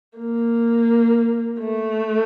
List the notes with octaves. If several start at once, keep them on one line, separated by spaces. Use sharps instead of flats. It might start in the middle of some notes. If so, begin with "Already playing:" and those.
A#3
A3